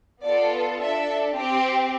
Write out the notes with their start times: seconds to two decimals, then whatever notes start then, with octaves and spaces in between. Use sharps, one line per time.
0.23 B3 F4 A4 D5
0.79 D4 A4 E5
1.35 C4 G4